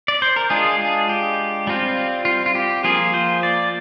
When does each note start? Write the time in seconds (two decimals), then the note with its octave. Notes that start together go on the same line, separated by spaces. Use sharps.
0.08 D5
0.22 C5
0.36 A#4
0.50 G#3 D4 F4 G#4
0.79 G#4
1.09 G4
1.67 G3 C4 F4
2.25 F4
2.46 F4
2.55 G4
2.84 F3 A#3 F4 G#4
3.14 C5
3.43 D5